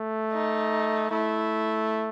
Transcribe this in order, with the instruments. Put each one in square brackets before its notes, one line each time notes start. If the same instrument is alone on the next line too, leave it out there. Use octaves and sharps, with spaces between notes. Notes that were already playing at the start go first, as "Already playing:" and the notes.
Already playing: [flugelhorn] A3
[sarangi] D#4
[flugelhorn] A3 [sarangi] E4